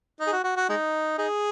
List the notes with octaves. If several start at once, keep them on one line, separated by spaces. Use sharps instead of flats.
D#4
G#4
F#4
F#4
F#4
G#3 D#4
D#4 G#4